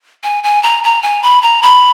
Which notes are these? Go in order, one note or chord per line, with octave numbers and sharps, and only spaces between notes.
G#5
G#5
A#5
A#5
G#5
B5
A#5
B5